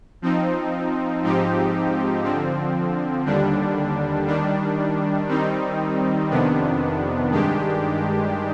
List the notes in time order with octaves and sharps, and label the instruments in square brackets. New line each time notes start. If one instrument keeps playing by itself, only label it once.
[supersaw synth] F3 C4 D#4
G#2 F3 C4 D#4 G4
D3 F3 C4
D#2 D3 G3 D4
D#3 G3 D4
D#3 G3 C4 D#4
F2 C3 D#3 B3 D4
G2 D#3 G#3 D4 G4